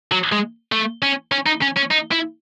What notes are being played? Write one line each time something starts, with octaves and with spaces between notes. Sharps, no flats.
F#3
G#3
A3
C#4
C#4
D#4
C#4
C#4
D#4
E4